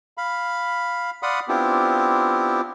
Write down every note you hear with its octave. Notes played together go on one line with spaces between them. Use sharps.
F5 B5
D5 F5 F#5 B5 C6 D#6
B3 C4 D4 E4 F4 G4